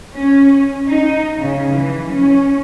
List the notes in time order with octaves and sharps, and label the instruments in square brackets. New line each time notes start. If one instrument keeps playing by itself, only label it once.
[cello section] C#4
D#4
C#3
E3
C#4